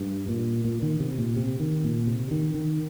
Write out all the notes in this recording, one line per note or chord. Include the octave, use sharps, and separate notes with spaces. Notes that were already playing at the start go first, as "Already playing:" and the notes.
Already playing: G2
A#2
A#2
D#3
C3
A#2
C3
D#3
A#2
C3
D#3
D#3